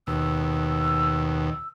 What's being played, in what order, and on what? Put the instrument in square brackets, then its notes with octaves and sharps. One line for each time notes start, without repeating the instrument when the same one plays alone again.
[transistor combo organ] D#2 B2 [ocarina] E6